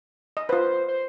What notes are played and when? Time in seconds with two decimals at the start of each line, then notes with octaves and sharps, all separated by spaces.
0.37 D#5
0.49 F4 B4 C5
0.88 C5